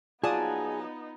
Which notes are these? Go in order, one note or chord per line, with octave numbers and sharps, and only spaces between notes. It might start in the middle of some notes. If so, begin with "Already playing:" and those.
F#3 B3 D#4 F4 G#4 D5 A5 D#6